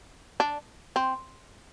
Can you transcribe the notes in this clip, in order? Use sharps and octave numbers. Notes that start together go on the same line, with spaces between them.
D4
C4